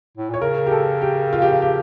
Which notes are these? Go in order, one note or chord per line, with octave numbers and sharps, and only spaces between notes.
A2
A#2 C#5
C#3 A#4
G4
A4
G4
F4
G4
F4
G4